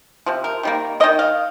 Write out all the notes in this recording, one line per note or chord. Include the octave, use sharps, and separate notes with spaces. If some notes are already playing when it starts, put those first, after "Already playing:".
C3 F3
A#4
D#3 G3 A#3
A#3 D#5
D#3
F5